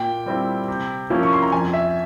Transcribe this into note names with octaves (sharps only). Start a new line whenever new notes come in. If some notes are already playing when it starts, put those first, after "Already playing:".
Already playing: A#2 G5
G3 C4 E4
C3
F3 A#3 C#4 E4
C#6
C6
A#5
F2 G#5
E5